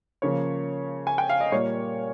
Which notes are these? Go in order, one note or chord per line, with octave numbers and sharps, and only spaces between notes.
C#3 F3 A#3 C#5
G#5
G5
F5
D#5
A#2 G3 A#3 C#5